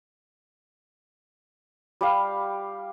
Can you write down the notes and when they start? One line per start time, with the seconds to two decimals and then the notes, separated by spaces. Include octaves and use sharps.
2.01 G3 G4 F5